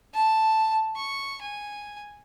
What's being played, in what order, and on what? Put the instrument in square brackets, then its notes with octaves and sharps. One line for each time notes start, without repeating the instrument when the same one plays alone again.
[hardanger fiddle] A5
C#6
G#5